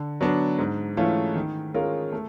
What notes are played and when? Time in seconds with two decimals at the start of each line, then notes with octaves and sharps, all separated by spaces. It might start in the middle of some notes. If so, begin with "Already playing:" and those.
Already playing: D3
0.21 F#3 B3 D4
0.59 G#2
0.97 E3 A3 C#4 F4
1.35 D#3
1.74 G#3 C#4 F4 A#4
2.12 A3